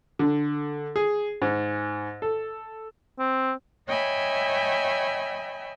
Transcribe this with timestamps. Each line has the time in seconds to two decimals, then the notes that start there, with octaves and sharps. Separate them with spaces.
0.19 D3
0.96 G#4
1.42 G#2
2.22 A4
3.19 C4
3.88 C#5 D#5 E5 G5 G#5 B5